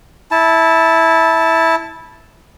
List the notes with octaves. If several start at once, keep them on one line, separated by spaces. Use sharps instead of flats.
E4 A5